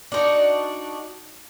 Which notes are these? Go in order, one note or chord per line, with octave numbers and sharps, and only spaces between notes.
D4 D#4 F#4